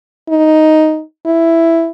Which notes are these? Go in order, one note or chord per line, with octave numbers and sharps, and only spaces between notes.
D#4
E4